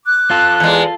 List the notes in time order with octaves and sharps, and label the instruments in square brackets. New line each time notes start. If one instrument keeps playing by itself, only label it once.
[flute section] D6 F#6
[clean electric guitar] F4 A4
[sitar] E2 G#3